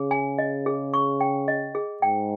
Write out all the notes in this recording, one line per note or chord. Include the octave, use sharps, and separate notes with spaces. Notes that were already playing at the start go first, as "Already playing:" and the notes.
Already playing: C#3 G#4
G#5
D#5
G#4
C#6
G5
D#5
G#4
G#2 G5